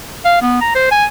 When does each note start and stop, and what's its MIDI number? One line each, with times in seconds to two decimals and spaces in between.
0.25 0.39 77
0.42 0.60 59
0.61 0.73 82
0.75 0.88 72
0.91 1.05 80